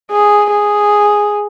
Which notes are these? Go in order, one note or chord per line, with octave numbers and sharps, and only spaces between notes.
G#4
G#4